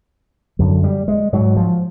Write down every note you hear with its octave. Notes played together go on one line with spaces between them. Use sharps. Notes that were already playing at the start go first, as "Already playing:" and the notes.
F#2 D3 F#3
G3
G#3
G#2 F#3
F3